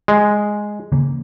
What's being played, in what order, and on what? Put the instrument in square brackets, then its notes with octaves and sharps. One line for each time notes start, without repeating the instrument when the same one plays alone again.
[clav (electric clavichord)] G#3
[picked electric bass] C#3 E3 A#3